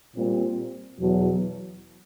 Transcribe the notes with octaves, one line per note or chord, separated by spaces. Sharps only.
A#2 G3 C4
E2 B2 F#3